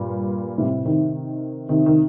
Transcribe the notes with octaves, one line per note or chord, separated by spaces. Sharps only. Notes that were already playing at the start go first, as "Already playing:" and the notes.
Already playing: G2 A#2
A2 C3
C3 D#3
C3 D#3
D#3